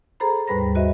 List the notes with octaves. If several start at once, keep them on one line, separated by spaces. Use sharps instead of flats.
G#4 A4 C5 A#5 B5
D#2 G#2 G3 B4 B5 A#6
F#4 C5 D#5 E5